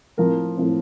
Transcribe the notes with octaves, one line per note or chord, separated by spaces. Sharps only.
A2 F3 C4 A#4
A2 F3 C4